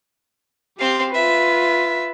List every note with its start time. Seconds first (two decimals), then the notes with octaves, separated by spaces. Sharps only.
0.79 C4 G4 F5 C6
1.14 F4 B4 E5